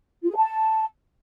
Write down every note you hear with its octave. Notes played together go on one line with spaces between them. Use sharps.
F4
G#4
A5